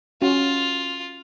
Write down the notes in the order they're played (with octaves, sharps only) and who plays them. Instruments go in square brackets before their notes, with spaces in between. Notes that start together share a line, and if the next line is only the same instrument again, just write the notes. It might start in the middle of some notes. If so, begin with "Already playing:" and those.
[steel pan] C#4 F#4 [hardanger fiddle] F4